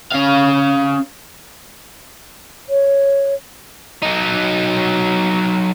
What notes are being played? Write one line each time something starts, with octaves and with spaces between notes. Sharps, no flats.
C#4 F5
C#5
F#3 D#4